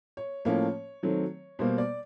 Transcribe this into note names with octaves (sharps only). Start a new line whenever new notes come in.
C#5
A2 F3 A#3 C#4 C#5
D#3 F#3 A3 C4
B2 G3 A#3 C5
D5